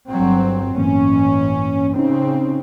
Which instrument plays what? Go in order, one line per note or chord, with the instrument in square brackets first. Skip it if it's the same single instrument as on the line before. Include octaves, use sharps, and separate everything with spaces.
[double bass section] G1 F#3 C4
[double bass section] A1 C#4 [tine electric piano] G2 E3 A#3
[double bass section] C#3 C4 [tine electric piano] C#4 D#4